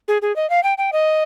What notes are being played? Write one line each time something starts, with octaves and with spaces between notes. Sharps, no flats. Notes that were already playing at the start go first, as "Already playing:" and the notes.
G#4
G#4
D#5
F5
G5
G5
D#5